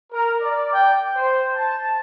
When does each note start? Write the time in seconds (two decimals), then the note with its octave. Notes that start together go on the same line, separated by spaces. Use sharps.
0.12 A#4
0.41 D5
0.72 G5
1.16 C5
1.54 A5